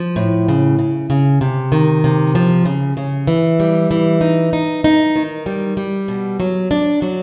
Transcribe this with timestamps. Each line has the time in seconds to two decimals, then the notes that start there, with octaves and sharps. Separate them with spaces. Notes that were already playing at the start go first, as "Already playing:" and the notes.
Already playing: F3
0.16 A2
0.48 C#3
0.79 C#3
1.10 C#3
1.41 C3
1.72 D#3
2.04 C3
2.35 F3
2.65 C#3
2.97 C#3
3.27 E3
3.60 G3
3.91 E3
4.21 D#4
4.53 D#4
4.84 D#4
5.16 D#3
5.46 G3
5.77 G3
6.08 B2
6.40 F#3
6.71 D4
7.02 F#3